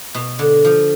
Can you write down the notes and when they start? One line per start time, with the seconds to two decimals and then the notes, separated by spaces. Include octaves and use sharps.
0.15 B2
0.39 D3
0.64 F3